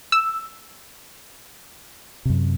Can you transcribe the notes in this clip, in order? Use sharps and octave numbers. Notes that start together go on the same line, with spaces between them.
E6
F#2 C3